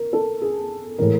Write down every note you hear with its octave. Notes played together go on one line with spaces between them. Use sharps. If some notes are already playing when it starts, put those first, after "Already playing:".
Already playing: A#4
A4
G#4
A2 E3 G#3 A#4